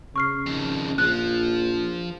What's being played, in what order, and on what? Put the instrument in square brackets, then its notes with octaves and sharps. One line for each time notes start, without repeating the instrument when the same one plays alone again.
[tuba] C#3 [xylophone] C#6 F6 C7
[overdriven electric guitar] F2 D#3
[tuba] A#1 [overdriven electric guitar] F3 [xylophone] F#6